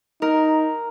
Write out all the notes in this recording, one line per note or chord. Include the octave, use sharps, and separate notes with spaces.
D#4 A#4